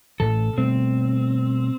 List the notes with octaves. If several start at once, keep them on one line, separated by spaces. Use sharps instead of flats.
A1 A2 E3 A4
B2 G3 A3 C4